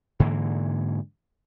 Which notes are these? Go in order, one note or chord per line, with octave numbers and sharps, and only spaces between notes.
G#2 D3 E3 A#3